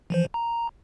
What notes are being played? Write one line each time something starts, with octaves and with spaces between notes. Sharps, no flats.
E3 F3 C5
A#5